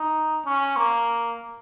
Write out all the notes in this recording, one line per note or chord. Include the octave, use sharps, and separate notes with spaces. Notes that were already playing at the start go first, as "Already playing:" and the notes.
Already playing: D#4
C#4
A#3